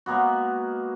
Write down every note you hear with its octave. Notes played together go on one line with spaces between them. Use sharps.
G#3 A#3 B3 F#4